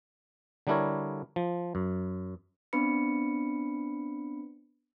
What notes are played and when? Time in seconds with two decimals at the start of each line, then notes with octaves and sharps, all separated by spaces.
0.67 D3 G3 D4 E4 A#4 C#5
1.36 F3
1.75 F#2
2.73 B3 C4 D4 B4 B5 C#7